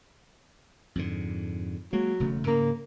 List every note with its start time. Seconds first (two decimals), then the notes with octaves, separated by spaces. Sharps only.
0.95 F2 G#2 D3
1.93 F#3 G#3 A#3
2.20 E1 C#3 A3
2.47 G#2 C#3 A#3